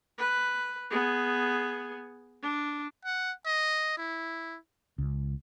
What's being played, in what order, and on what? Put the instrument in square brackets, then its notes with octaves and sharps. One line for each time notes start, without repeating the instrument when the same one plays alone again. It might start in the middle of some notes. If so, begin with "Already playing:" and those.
[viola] B4
B3 G#4
D4
[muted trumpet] F#5
D#5
E4
[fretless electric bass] C#2